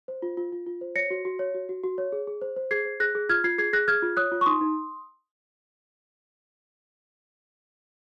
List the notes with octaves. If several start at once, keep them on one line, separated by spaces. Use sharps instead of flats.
C5
F4
F4
F4
F4
C5
C#5 A#6 C#7
F#4
F#4
C#5
F#4
F#4
F#4
C#5
G#4
G#4
C5
C5
G#4 G#6 C7
C5
G#4 F#6 A#6
G#4
F4 F6 G#6
F4 G#6 C7
G#4 G#6 C7
G#4 F#6 A#6
G#4 F6 G#6
F4
C#5 D#6 F#6
F4
C#6
D#4 C6 D#6
D#4